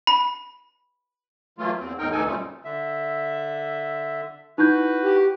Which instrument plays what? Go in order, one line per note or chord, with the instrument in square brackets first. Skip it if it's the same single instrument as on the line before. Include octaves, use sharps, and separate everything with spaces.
[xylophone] B5
[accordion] E3 F#3 A3 A#3 F4
E2 C4
E2 A2 D#4 A#4 G5
D2 E3 D#4 A4 G#5
F#2 A#2 C#3 G3 A3 C4
[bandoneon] D3 E5
[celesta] D#4 E4 G6 [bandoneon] F#4 B4
[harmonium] G4